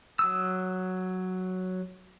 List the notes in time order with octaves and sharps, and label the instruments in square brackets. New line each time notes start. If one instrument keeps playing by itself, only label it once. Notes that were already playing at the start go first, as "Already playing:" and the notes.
[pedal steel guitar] F#3 D#6 E6